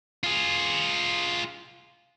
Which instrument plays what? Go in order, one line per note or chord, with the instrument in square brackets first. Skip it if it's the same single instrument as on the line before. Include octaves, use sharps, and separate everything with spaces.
[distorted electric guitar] F4 G#4